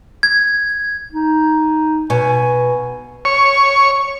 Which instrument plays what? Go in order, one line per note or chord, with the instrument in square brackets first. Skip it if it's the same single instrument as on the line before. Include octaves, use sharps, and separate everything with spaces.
[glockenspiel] G#6
[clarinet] D#4
[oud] B2 [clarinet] G#5
[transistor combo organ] C#5 C#6